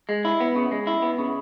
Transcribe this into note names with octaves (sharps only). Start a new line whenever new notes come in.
G#3
E4
B3
C#3
G#3
E4
B3
C#3